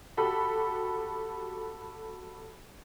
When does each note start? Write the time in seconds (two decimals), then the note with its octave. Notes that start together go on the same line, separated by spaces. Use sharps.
0.17 F#4 G4 A4 B5